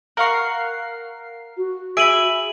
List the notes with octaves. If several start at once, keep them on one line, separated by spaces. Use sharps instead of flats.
A#4 F5 F#5 C#6 C7
F#4
G#4 E5 B5 D7 D#7 F#7